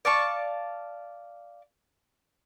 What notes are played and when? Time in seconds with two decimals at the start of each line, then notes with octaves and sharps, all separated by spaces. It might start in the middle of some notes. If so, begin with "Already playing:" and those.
0.05 D5 F5 A5 C#6